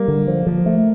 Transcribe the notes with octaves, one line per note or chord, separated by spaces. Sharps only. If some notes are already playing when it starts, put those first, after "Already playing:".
Already playing: G3 A#3
D3
F3
F3
A3